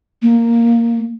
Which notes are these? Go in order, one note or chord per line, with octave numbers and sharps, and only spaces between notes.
A#3